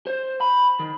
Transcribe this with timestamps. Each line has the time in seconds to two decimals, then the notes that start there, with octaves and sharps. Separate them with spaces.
0.07 C5
0.41 B5
0.79 D#3